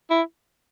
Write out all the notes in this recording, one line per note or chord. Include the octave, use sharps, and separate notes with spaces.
E4